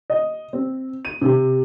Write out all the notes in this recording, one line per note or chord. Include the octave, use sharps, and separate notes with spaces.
D#5
C4
D#7
C3